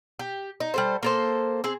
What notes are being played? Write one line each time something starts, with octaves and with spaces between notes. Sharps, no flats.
G4
D#4
G3 A4 C5
A#3 A4 C5
C4 G#4